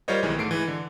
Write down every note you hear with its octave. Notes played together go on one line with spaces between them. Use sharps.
G3 F4 A#4 C5 C#5 D#5
B1 D#3 E3 G#3
G#2 A3 C7 D7
E3 G#3
D3